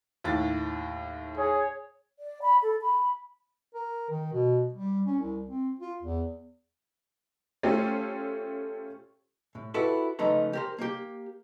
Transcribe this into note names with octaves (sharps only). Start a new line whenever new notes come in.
D#2 A2 A6
G#4 C#5
D5
B5
A4
B5
A#4
D#3
B2
G3
C#4
C2
C4
F4
E2
A3 C#4 F4 G4 A4 C5
A2
E4 F#4 G4 A4 B4
C#2 F3 A3 D#4 B4 A#5
G4 A#4 C5
A#3 G4